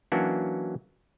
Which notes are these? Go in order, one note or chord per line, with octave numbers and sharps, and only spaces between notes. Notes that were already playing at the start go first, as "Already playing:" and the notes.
E3 F#3 A#3 C#4 D4 F#4